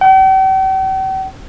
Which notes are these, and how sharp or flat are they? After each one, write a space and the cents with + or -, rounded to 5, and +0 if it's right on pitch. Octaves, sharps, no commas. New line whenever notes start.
G5 -45